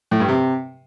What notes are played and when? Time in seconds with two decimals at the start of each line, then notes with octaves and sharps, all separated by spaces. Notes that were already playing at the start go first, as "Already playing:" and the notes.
0.11 A2
0.20 G2
0.29 C3